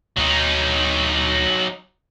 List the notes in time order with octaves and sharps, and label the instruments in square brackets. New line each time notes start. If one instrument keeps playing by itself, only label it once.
[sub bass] D2 [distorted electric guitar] F#3 D#4